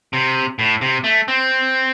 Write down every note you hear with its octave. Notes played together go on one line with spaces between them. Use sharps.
C3
A2
C3
A3
C4